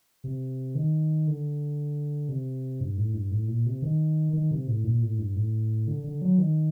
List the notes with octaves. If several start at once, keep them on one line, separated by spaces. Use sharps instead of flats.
C3
D#3
D3
C3
G2
A2
G2
A2
A#2
C3
D#3
D#3
C3
A2
A#2
A2
G2
A2
D3
D3
F#3
D#3